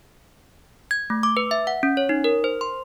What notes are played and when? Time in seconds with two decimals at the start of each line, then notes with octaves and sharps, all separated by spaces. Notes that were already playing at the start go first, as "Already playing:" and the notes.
0.91 G#6
1.10 A3
1.23 D6
1.37 B4
1.51 E5
1.67 F#5
1.83 C#4
1.97 C#5
2.09 D#4
2.24 A#4
2.44 C5
2.61 C6